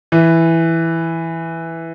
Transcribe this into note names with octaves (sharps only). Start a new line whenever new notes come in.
E3